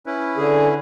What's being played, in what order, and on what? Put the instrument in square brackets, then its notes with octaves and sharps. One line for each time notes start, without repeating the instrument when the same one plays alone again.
[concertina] C#4 E4 B4
[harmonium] D3 G#4